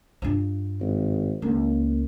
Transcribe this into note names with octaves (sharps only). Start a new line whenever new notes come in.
G2 F4
G#1
C#2 A#3